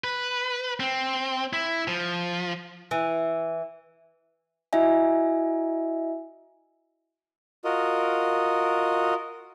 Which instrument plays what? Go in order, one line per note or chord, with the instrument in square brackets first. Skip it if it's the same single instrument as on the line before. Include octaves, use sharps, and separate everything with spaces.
[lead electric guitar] B4
C4
E4
F3
[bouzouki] E3
[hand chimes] E4 F#4 D#5 E5 G#5
[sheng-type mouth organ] F4 F#4 A#4 D#5